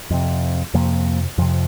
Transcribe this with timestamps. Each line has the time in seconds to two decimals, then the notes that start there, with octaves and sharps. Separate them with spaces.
0.11 F2 C3
0.74 F2 C3 F3 A#3
1.38 F2 C3 F3